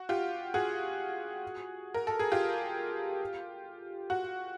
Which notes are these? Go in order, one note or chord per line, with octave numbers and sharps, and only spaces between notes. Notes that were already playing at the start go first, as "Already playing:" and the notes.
Already playing: F#4
F4 G4
F#4 G#4
A#4
A4
G#4
F4 G4
F#4